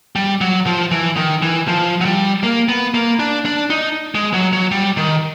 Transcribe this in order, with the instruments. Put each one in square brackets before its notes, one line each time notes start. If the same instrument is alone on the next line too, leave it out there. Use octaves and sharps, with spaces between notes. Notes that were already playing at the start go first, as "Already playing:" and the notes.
[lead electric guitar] G3
F#3
F3
E3
D#3
E3
F3
F#3
G3
A#3
B3
A#3
D4
D4
D#4
G#3
F#3
F#3
G3
D#3